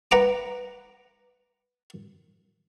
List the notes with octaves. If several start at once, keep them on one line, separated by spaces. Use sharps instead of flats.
B4 F#5 A#5 D6